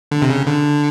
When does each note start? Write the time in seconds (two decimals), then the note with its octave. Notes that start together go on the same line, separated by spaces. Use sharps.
0.11 D3
0.22 C3
0.30 C#3
0.47 D3